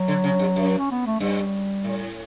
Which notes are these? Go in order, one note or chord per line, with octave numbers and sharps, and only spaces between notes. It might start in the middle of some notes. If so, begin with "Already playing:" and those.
Already playing: F#3
D3
C#3
G2
F#2
C#4
B3
A3
G2 G3
A2